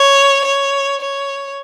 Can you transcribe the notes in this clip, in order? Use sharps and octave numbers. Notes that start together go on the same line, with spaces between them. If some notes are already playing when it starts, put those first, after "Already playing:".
Already playing: C#5
C#5
C#5